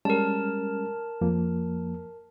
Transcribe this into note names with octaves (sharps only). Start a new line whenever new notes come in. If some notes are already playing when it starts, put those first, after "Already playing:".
G3 G#3 C#4 A#4 A5
F2 F3 A#3